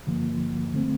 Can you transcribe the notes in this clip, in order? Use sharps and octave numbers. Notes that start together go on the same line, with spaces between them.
G2 D3 F3 A#3
D3 A3 C4